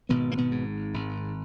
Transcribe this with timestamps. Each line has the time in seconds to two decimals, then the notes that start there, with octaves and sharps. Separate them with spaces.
0.09 G#1 B2 B3
0.31 A#3
0.38 B2 B3
0.51 G#2
0.94 G#1